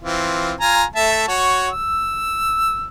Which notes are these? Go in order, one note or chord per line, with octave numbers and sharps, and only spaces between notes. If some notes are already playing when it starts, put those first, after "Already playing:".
E3 C4 F4
F4 G#5 A#5
A3 E5 A5
F#4 C#5
E6